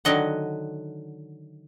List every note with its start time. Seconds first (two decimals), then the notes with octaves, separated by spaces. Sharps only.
0.05 D3 D#3 F#3 D#5 F#5